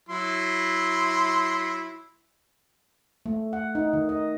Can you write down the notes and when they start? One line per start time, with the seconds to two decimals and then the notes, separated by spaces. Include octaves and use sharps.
0.09 F#3 E4 C6
3.26 A3
3.53 F#5
3.75 D#4
3.93 D#3
4.09 D#5